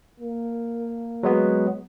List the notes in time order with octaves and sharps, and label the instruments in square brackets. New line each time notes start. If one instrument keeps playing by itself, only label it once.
[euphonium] A#3
[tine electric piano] F#3 G#3 B3